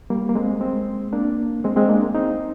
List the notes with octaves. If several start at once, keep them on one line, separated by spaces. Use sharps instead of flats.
G3 A#3
A#3
G#3 C4
G#3 C4
A#3 D4
G#3 C4
G#3 C4
A#3 D4
C4 D#4